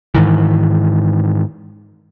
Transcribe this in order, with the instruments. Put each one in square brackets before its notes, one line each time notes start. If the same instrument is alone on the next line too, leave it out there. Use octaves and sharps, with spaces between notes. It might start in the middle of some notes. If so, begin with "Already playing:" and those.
[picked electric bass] G#2 D#3 E3